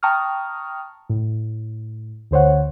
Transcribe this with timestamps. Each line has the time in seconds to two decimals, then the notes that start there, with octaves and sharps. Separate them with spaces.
0.03 G5 A5 A#5 C#6 D#6 F6
1.09 A2
2.31 D2 D3 C5 C#5 F#5